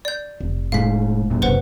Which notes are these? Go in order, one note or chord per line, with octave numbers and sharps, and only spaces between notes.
D5 G6
F1
A2 G#3 F5 B6
F#2 A#2
F#1 C3 B4 C5 F#5